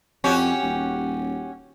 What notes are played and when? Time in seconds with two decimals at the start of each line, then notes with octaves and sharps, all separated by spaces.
0.24 F2 C#4 F#4 G4
0.63 D#1